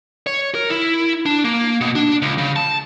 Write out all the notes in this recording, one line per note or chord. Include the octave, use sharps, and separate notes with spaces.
C#5
A#4
E4
D4
A#3
B2
D4
C#2
C#3
A5